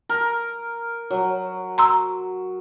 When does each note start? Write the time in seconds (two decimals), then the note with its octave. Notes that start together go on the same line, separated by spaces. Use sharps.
0.09 A#4
1.11 F#3
1.78 A#5 C6 E6